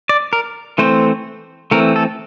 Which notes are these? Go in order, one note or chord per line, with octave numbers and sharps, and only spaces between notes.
D5
A#4
E3 A3 C4 C5
E3 A3 C4 A#4
A4